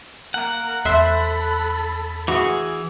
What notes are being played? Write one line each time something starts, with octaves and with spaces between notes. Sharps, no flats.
A#3 A#4 F#5
E2 A4 C5 E5 B5
E3 F#4 G#4